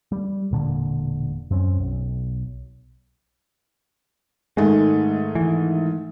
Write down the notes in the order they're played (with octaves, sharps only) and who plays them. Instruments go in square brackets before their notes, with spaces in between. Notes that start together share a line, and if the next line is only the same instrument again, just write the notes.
[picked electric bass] G3
E1 A#2 D3
F#2 C4 C#4
B1
[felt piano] G#2 D#3 A3 [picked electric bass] G#3
[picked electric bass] E3